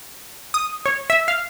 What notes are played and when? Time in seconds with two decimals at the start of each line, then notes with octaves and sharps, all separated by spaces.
0.54 D#6
0.86 C#5
1.10 E5
1.28 F5